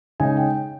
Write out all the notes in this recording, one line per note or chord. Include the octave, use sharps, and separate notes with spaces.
C#3 G#3 D#4 G#5
G5